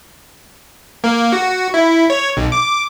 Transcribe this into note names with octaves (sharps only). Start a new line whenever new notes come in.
A#3
F#4
E4
C#5
B1
D6